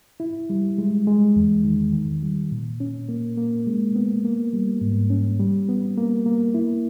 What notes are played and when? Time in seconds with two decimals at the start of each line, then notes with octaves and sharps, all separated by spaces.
0.20 E4
0.50 G3
0.78 G#3
1.07 G#3
1.36 E2
1.64 D#3
1.93 D#3
2.23 G3
2.52 A#2
2.80 C#4
3.09 A#3
3.37 A#3
3.67 G#3
3.96 B3
4.25 A#3
4.53 G3
4.81 G#2
5.10 C#4
5.40 G3
5.69 B3
5.97 A#3
6.26 A#3
6.54 E4